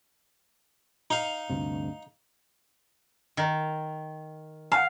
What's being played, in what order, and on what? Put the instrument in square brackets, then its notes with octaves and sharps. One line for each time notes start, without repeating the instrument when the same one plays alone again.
[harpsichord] D#4 F5
[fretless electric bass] D2 G2 C3
[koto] D#3
[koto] F5 [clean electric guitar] F#5 G#5